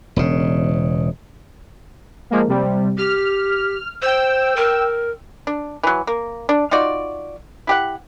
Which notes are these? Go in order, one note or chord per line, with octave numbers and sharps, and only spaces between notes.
E1 C#3
F3 G#3 A#3
C3 G3
G4 F6
C5 G5 E6
A#4
D4
E3 F#3
A#3
D4
D#4 F4 F#4 D5
E4 G4 F#5